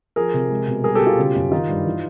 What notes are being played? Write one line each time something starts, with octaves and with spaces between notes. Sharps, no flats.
F3 G#4 A#4
C3
G#3
B2
G3 G#4 A#4
G4 A4
B2
F4 G4
C#3
F#2
D#3 D#4 F4
G2
E3